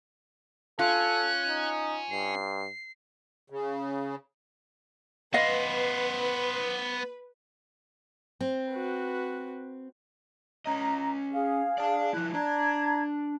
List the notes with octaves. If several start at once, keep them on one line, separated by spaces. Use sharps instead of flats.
C#4 F4 A4 F#6
D#4
G2 C7
C#3
B3 B4 C5 D#5 F5
C4
F#4 B4
C#4 D#5 A#5
G#4 F5
D5 A5
F3 E4 F#6
D4 D5 A5 A#5 G#6